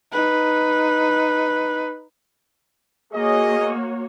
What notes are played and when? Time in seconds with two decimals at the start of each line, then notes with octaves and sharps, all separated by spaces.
0.12 D#4 B4
3.14 A#3 F#4 G#4 C#5 D#5